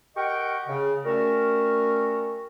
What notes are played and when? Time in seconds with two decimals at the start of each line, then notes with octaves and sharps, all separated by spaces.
0.16 G4 A#4 D#5 F#5 G5 C#6
0.67 C#3
1.03 G3 A3 C#4 F#4 A#4